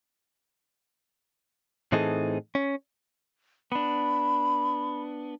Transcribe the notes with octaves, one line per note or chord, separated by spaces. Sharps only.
A2 E3 C4 D#4 G#4 A4
C#4
B3 D4 B5